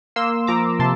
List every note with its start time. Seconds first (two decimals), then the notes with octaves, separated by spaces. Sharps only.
0.16 A#3 C6 E6
0.47 F3 A#5 D6
0.79 C3 A5 C6